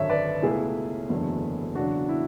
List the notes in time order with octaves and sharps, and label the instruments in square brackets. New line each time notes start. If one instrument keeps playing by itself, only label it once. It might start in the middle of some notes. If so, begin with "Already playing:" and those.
Already playing: [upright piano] G#1 F#2 D3 C#5 E5
B4 D5
C#2 B2 A3 E4 G#4
F#1 E2 D3 F#3 A3
E1 E2 C#3 F#3 D4 F#4
E4